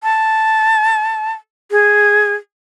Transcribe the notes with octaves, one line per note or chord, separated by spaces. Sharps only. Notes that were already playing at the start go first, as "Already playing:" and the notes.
A5
G#4